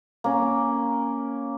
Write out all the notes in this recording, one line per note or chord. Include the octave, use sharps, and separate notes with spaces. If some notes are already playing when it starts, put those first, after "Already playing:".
A#3 C#4